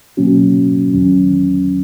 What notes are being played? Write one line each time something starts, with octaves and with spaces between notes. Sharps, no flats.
B2 F#3 A#3 C#4 F#4
E2 D#3 F#3 C#4